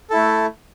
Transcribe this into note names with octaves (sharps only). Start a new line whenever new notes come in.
A3 E4 A4